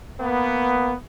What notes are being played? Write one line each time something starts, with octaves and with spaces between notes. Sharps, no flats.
A#3 B3